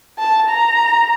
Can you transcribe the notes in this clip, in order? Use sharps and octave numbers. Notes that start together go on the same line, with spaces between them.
A5
A#5